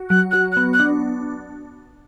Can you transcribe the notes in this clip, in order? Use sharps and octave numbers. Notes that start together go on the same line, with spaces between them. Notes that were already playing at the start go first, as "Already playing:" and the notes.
Already playing: F#4
F#3 F#6
F#4 F#6
B3 F#6
F#6
D4